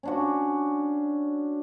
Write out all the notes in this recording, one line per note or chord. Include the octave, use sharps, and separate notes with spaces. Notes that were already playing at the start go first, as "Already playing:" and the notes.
C#4 D4 F#4